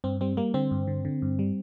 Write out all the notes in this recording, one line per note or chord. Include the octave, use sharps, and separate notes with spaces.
G2 C4
G3 C4
G3 A#3
D3 C4
G2
D3
D3
G2
G3